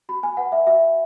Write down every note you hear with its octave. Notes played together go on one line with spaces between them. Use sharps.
F#4 B5
G#5
B4 F#5
E5
F#4 E5